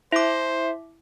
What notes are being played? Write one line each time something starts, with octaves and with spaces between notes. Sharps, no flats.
E4 C5 E5 D6